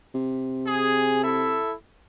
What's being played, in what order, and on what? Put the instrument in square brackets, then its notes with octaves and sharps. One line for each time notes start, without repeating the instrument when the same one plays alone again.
[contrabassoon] C3
[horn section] G#4
E4 A4 E5